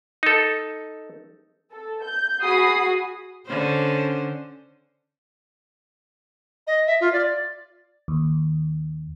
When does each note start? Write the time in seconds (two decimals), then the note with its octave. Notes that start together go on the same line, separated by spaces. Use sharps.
0.23 D#4 A4
1.71 A4
2.03 G6
2.43 F#4 G#4 B5 D#6 C7
3.46 D3 C#4 C5
6.67 D#5
6.87 E5
7.01 F4
7.13 D5
8.08 D#2